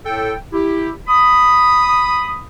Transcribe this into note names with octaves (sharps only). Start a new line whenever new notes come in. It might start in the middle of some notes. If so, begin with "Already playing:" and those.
A2 A4 G5
E4 G4
B5 D#6